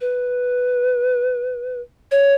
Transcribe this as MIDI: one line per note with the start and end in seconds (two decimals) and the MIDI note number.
0.01 1.81 71
2.11 2.34 73